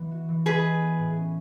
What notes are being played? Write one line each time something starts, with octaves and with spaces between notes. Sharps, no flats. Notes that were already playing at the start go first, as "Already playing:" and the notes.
Already playing: E3 B3
F#4
E3
G#3 G#4 B4
E4
B3
A2
C#4